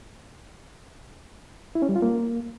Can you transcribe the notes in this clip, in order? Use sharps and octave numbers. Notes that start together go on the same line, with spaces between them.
E4
C#4
G3
F4
A#3